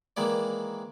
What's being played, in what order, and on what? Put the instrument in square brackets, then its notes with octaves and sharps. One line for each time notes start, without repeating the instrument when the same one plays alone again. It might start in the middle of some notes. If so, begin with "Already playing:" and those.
[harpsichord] D#3 E3 G#3 A#3 D5